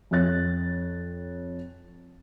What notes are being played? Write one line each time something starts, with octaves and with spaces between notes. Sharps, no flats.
F2 C#5 F#6 A6